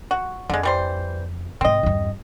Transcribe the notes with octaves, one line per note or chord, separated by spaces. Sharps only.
F#4
F2 D3 G#3
E3 G3 C5
G#2 C3 C4 D#5
E2 G2